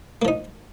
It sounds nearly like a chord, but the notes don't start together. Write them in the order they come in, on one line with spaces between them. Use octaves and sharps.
A#3 F3 D#4